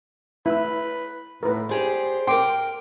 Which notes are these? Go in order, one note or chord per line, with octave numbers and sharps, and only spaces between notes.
E4 B4 E6
A2 A#4 B4
G4 G#4 C5 D5
A#4 G5 C6 D6